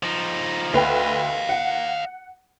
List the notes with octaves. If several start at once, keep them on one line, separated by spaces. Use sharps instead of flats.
F3 D#4
D2 B4 D#5 F5 G5
F#5